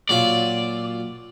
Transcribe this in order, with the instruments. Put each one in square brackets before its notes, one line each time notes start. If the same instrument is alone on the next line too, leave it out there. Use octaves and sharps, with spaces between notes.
[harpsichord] A#2 F#3 F4 [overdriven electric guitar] D5